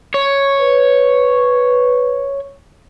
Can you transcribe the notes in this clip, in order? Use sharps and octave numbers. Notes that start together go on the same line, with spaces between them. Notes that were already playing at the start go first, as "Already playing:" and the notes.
C#5
B4